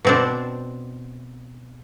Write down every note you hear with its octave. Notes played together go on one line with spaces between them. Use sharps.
B2 C4 D4